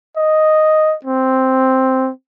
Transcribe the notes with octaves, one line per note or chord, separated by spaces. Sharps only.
D#5
C4